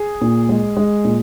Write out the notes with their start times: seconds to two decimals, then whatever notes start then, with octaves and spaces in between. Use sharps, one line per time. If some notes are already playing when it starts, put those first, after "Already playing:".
Already playing: G#4
0.21 A#2
0.49 G#3
0.77 G#3
1.05 A#2